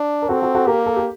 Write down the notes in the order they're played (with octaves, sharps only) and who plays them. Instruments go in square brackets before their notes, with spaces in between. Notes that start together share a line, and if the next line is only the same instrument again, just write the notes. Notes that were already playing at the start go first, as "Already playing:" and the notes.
Already playing: [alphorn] D4
[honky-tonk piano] A#4
[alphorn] C4 [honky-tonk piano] F#4 A4
[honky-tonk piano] F#4 A4
F#4 A4
[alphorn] A#3 [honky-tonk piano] G4 A#4
[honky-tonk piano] A4
G4